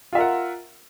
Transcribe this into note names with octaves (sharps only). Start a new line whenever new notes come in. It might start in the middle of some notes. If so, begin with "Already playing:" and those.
F4 A#4 E5 F#5